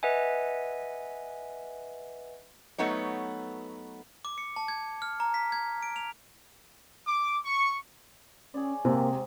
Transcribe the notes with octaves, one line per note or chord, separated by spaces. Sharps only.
B4 D#5 E5 F#5 G#5
F#3 A3 B3 D#4 C#5
D6
C#7
A5
G#6
F6
A#5
B6
G#6
D7
F7
D6
C#6
C#4 G#4 C#5 D5
G#2 C3 A#3 C4